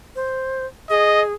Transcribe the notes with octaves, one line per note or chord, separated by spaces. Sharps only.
C5
G#4 D#5